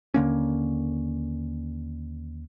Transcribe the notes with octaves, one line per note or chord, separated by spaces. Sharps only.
D#2 D3 A#3 C#4